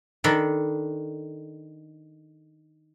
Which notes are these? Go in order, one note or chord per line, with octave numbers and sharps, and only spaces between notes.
D#3 D4 A4 B5